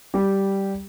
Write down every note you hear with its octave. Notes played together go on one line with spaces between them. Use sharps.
G3 G4